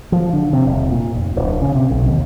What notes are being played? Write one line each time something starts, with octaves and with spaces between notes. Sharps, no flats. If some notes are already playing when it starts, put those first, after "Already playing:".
F3
D3
C3
D#1
A#2
F1
D1
C#3
C3
B1
D#2